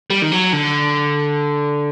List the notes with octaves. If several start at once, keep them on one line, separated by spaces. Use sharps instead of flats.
G3
D#3
F#3
D3